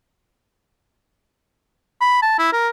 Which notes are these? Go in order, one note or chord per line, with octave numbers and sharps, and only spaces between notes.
B5
A5
E4
A#4